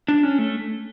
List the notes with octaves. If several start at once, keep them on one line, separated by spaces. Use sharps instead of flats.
D4
C#4
A3